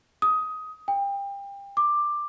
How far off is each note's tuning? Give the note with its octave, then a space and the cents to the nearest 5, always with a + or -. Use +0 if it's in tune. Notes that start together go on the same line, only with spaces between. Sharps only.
D#6 +15
G5 +30
D6 +10